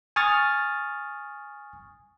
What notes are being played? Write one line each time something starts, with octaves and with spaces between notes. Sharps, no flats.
G#5 C#6 D#6 F6 A6